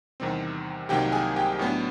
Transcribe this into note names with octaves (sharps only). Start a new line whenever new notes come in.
E2 C3 D#3 G3 C4
C2 C3 D#3 F#3 A#3 G4 G5
G#4 G#5
G4 G5
A2 F#3 B3 D4